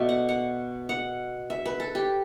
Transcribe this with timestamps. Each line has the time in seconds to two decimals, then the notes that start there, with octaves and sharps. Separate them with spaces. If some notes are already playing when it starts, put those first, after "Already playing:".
Already playing: B2 A3 D5 E5
0.09 F#5
0.29 F#5
0.89 F#5
1.50 E5
1.65 B4
1.80 A4
1.95 G4